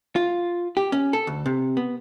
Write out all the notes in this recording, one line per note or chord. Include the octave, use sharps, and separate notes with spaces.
F4
G4
C#4
A4
D2
C3
B3